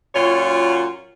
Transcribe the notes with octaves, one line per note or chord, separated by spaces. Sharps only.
F#2 A#2 F4 C#5